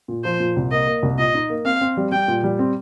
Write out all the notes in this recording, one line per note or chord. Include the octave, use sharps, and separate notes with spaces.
A#2
F3 C5
A#2
C2
A#3 D#5
A#3
C2
A#2 D#5
D#4
A#3
C4 F5
C4
G3
G3 G5
A#2
G3
C4